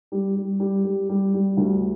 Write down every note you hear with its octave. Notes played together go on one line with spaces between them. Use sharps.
G3
G3
G3
G3
G3
G3
D2